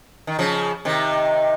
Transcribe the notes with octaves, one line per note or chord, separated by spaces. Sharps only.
D#3
C#3 F3
C3 D#3